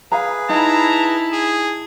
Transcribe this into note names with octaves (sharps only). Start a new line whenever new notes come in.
G#4 B4 F5 G#5 A#5
D#4 E4 A5 A#5
G#4